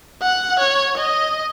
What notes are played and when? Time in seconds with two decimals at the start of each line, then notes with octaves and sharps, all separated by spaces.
0.22 F#5
0.59 C#5
0.97 D#5